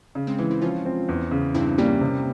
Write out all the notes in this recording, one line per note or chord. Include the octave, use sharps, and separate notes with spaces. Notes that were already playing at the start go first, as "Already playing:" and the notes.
C#3
G#3 C4
E3 G#3 C4
C4 E4
F3 C#4 F4
C4
E2
C#3
G2 C4 E4
G3 A#3 C#4
C3